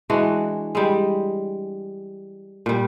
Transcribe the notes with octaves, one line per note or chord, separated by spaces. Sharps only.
E3 G#3 D4 F#4
G3 G#3
A#2 G3